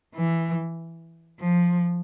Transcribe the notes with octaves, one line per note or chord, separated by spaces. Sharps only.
E3
F3